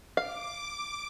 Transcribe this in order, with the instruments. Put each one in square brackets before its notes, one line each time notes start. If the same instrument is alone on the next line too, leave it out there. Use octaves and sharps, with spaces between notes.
[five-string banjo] F5 [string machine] D6